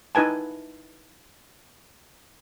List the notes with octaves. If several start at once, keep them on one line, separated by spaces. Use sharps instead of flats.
D#4 E4 B4 G#5 A5